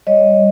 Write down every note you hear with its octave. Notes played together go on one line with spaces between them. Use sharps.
G3 C#5 D#5